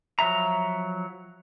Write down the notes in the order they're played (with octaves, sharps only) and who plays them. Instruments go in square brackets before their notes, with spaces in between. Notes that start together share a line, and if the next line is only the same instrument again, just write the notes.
[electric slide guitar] F3 F#3 E5 A#5